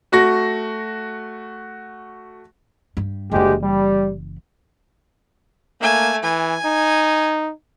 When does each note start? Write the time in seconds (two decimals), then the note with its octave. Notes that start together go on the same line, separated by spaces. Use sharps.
0.12 A3 F#4 C#6 A#6
2.97 G2
3.32 F#1 D2 E3 G#3 G4
3.61 G3
5.81 A3 A#3 G#5
6.23 E3 G#5
6.65 D#4